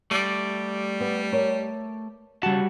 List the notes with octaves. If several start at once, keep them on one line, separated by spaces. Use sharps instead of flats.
G3 A3 D5
B3
A#4 C#5
C#3 G3 F#4 A5